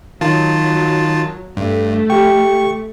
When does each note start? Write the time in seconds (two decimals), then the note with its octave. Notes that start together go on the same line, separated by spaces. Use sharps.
0.21 D#3 F#3 F4 A5
1.57 G2 A3
2.10 G4 G5 C#6